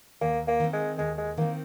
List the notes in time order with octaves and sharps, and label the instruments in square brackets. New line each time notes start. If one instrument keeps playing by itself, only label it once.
[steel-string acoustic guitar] D#2 [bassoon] A#3
[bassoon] A#3
[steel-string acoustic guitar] D#3 C4
[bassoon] G#3
[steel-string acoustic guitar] D#2 [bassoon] G#3
[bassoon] G#3
[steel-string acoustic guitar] D#3 C4 [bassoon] A#3